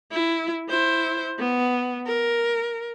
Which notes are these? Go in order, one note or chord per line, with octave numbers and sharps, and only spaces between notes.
E4
E4 C5
B3
A#4